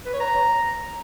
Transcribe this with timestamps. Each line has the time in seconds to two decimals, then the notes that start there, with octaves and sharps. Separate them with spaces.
0.06 B4
0.13 C#5
0.20 A#5